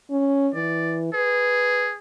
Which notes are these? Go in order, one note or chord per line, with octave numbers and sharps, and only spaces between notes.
C#4
E3 D5
G#4 B4